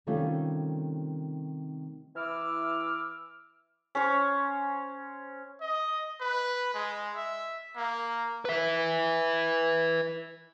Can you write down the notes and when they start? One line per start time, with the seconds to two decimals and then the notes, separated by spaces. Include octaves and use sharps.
0.07 C3 D#3 G3 A3 C#4 F4
2.16 E3 E4 E5 D6 E6 F6
3.95 C#4 C5 C#5
5.61 D#5
6.20 B4
6.74 G#3
7.16 E5
7.76 A#3
8.45 B4 E5